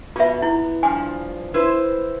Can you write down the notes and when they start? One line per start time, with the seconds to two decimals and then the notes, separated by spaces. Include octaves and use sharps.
0.16 B2 B3 F4 E5
0.42 B3 E4
0.83 G2 F3 G#5
1.54 E4 B4 C5